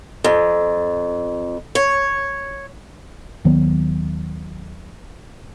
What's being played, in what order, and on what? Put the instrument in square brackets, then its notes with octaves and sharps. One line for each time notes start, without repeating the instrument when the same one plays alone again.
[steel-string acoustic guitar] F2
C#5
[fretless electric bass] D#2 D#3 F#3 B3